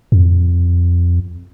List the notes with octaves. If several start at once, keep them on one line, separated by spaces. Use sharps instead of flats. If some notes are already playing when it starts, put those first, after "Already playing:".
F2